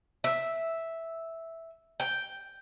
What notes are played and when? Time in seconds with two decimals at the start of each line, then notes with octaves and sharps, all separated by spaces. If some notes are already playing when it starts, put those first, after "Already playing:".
0.24 E5
2.00 G5